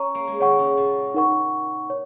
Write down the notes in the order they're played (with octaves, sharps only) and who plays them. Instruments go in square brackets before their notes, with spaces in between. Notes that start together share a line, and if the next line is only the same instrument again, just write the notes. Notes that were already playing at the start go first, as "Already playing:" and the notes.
Already playing: [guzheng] C#4 [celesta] C#5 A#5 C#6
[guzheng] A#3
G#3
[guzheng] D#3 [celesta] C#5 F#5 C#6
[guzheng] C#3
A#2
[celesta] D#4 A#4 F#5 C#6
C#5